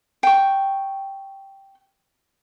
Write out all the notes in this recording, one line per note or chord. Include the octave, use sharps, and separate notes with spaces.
G5 C#6